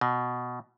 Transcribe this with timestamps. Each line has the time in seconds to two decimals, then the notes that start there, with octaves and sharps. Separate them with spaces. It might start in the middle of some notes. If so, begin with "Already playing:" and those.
0.01 B2